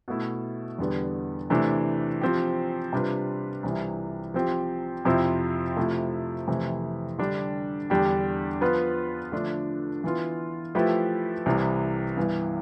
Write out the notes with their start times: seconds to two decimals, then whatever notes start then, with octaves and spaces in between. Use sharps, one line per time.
0.08 B2 A3 E4
0.79 E2 D3 G3 B3
1.50 C3 E3 A3 D4
2.21 F3 C4 G4
2.93 C3 G3 D4 F4 B4
3.63 C2 C3 E3
4.34 F3 C4 G4
5.05 F2 C3 F3 C4 E4
5.77 C3 F3 A3 E4
6.48 F2 C3 E3 A3 E4
7.19 D3 G3 D4 G4
7.90 E2 D3 G3 D4 G4
8.61 F3 B3 F4 B4
9.32 D3 F3 A3 D4
10.04 E3 B3 F4
10.75 F3 A3 E4 G4 B4
11.46 C2 C3 E3
12.17 G2 E3 B3